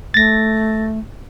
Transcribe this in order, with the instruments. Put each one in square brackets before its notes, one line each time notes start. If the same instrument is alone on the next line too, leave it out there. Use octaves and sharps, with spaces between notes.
[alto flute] A3 [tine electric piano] A6 A#6